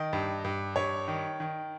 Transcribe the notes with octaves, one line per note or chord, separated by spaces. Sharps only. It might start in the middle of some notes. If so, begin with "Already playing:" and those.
Already playing: D#3 D#5
G2
G2
G2 C#5
D#3
D#3